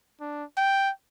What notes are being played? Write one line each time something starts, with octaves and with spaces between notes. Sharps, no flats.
D4
G5